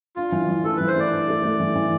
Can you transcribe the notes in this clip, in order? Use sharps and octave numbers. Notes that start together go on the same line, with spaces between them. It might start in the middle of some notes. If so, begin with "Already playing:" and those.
D4 F4
E3
E3
A3 A4
E3 B4
C5
A3 D5
D4
A3
A3
E3
E3